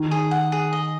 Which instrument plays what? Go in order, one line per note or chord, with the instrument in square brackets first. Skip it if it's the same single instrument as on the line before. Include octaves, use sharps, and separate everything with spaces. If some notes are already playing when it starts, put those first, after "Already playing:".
Already playing: [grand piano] D#3
[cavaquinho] G#4
F#5
G#4
D#5